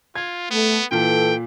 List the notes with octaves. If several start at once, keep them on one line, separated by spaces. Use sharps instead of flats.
F4 G#6
A3 B3
A#2 E3 A4 G5